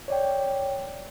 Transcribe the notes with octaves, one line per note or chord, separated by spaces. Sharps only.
C#5 D5 G5